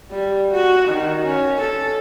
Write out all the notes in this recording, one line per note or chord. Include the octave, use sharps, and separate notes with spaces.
G3
F#4
D#3
C#4
A4